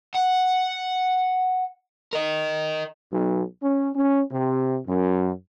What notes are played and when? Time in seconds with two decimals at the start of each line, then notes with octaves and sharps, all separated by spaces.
0.15 F#5
2.13 A#4 D#5
3.13 B1
3.62 C#4
3.95 C#4
4.31 C3
4.87 F#2